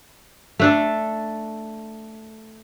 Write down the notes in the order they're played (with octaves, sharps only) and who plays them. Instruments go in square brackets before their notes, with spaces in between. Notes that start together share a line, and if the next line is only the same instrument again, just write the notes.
[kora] A3 D4 A4